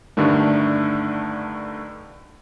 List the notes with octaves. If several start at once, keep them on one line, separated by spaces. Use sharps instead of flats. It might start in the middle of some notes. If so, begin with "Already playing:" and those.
G2 D3 D#3 A3 D4